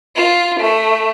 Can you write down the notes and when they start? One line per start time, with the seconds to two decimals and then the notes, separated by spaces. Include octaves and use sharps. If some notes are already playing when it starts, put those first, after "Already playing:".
0.16 F4
0.60 A3